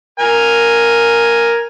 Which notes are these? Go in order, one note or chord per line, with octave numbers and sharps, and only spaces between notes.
A#4 G#5